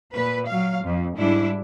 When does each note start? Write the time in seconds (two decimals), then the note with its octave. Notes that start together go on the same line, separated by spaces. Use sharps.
0.14 A#2 B4
0.47 F#3 F5
0.84 F2
1.16 G#2 G3 D4 E4